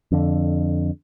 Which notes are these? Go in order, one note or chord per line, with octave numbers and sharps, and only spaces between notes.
F2 D3